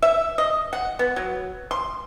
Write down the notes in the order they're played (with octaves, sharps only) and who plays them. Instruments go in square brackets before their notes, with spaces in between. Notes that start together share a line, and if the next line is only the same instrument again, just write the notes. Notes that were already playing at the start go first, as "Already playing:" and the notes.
[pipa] E5
D#5
F#5
B3
F#3
C6